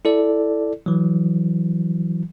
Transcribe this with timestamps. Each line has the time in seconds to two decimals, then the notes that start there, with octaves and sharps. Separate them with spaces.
0.05 E4 A4 D5
0.86 E3 F#3